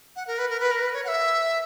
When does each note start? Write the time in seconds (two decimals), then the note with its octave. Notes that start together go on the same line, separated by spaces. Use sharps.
0.16 F#5
0.27 A#4
0.38 B4
0.50 A#4
0.60 B4
0.71 A#4
0.82 B4
0.94 C#5
1.04 F#5
1.08 E5